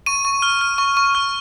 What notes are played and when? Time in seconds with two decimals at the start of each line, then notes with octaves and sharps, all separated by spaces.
0.06 C#6 D#7
0.25 C#6
0.42 F6
0.61 F6
0.78 C#6
0.97 C#6
1.15 F6